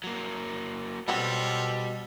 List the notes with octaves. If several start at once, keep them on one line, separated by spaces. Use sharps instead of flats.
F#3 A#3
B2 G3 C4 F4 F#4 A4 B4 C#5